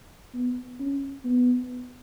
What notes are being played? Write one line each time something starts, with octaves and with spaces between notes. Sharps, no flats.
B3
C#4
B3